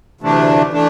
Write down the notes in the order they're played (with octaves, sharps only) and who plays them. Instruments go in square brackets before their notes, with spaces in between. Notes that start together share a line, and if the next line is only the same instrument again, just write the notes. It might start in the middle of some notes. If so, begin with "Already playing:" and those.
[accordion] D2 C3 E3 A3 D4
E3 A3 D4